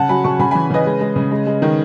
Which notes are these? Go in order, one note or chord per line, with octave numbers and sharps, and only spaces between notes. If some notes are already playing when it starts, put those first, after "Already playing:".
Already playing: C#3 F#5 A5
F#3 G#5 B5
C#3 A5 C#6
C#3 G#5 B5
E3 G#5 B5
C#3 B4 D#5
G#3
G#3
C#3
G#3
G#3
D#3